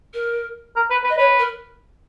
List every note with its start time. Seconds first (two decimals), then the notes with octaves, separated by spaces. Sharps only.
0.14 A#4
0.76 A#4
0.91 B4
1.04 B4
1.10 D#5
1.17 B4 C#5
1.39 A#4